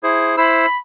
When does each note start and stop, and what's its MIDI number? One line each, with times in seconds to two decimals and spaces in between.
0.03 0.35 64
0.03 0.35 68
0.03 0.35 72
0.37 0.66 64
0.37 0.66 72
0.37 0.76 83
0.37 0.66 88